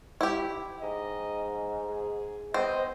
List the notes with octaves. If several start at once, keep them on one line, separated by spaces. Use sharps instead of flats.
E4 G4
G#2 D#5
G#4
B3 C4 C5 D#5